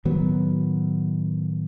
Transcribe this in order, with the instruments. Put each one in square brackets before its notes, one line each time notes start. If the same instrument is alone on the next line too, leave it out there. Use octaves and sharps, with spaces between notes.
[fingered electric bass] A2 D#3 F#3 B3